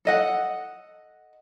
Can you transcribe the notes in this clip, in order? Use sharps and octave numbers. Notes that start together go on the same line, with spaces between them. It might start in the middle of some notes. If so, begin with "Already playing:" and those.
A4 D#5 F#5